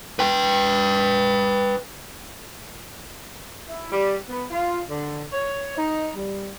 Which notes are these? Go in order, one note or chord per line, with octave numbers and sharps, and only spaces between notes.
B4 G5
E4
G3
B3
F4
D3
C#5
D#4
G3